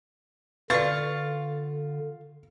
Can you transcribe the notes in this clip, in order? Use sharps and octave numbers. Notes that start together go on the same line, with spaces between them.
D3 F4 B4 D5 F5 C#6 A6